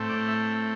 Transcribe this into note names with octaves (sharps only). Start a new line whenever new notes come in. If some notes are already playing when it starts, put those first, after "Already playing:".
Already playing: A2 A3 C4
D5
E5
E5